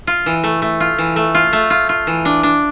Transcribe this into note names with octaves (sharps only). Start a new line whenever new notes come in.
F4
E3
A3
A3
F4
E3
A3
F4
A3
F4
F4
E3
D4
D4